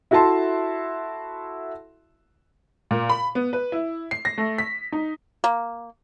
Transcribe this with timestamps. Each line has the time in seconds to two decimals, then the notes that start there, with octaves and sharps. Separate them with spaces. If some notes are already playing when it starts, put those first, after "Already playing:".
0.11 E4 F#4 A4 E5 A5 C6
2.91 A#2
3.09 B5
3.35 B3
3.53 B4
3.72 E4
4.11 C7
4.25 A#6
4.38 A3
4.58 B6
4.92 D#4
5.44 A#3